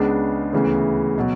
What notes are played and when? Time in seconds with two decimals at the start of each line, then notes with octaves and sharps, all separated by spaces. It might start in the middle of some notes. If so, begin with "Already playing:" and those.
Already playing: C#2 C#3 G#3 B3 D4
0.53 D2 C#3 E3 B3
1.18 B2 F#3